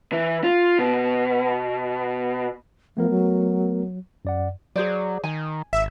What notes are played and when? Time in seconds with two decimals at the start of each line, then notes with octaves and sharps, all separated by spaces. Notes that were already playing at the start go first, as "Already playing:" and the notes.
0.12 E3
0.44 F4
0.79 B2
2.97 F3 A3 B3 A#4
3.10 F#3
4.25 F#2 D5 F#5
4.76 F#3 G#4 C5 D5
5.24 D#3 G#5
5.73 G#1 E5